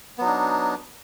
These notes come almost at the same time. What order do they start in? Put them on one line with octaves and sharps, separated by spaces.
B3 F#3 D#4 D4